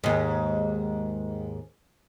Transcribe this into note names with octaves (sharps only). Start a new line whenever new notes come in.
D#2 G#2